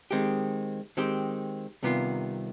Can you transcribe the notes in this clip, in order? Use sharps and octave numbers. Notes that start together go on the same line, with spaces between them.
D#3 G#3 C4 G4
D#3 G#3 C4 G4
C2 C3 D#3 B3 F4